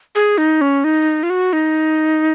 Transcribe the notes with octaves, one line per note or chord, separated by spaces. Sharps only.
G#4
D#4
C#4
D#4
F4
F#4
D#4